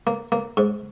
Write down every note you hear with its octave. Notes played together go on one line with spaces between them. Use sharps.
A#3
A#3
G#2